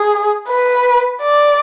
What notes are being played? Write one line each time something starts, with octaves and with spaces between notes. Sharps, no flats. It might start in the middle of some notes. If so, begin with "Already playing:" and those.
Already playing: G#4
B4
D5